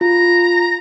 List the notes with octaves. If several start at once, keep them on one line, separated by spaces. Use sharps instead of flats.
F4 A#5